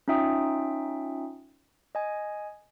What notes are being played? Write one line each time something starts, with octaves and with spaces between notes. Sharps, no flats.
C#4 D#4 F4 E5 G5 D#6
D#5 G#5